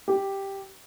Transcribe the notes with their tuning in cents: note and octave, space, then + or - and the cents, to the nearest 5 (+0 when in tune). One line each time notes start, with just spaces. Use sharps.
G4 +0